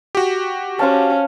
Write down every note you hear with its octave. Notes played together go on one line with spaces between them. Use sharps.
F#4 G4
C#4 C5 F5 A5